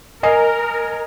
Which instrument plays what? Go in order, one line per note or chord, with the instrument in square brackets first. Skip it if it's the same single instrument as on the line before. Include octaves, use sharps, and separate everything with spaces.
[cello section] A#4 [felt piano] D#5 G#5 C7